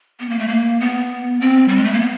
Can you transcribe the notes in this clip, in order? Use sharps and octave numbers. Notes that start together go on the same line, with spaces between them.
B3
A#3
A3
A#3
B3
C4
G3
G#3
A3
A#3
B3